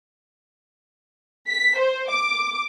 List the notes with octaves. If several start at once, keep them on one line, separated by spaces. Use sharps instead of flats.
B6
C5
D6